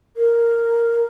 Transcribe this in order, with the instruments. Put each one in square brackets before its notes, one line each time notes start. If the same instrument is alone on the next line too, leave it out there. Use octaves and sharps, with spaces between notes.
[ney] A#4